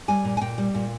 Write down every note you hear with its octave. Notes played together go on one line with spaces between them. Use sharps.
G3 G#5
A#2
G#5
A#2 G5
G3
A#2